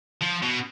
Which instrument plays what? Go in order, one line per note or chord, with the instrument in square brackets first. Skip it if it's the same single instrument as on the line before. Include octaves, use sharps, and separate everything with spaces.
[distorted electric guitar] F3
B2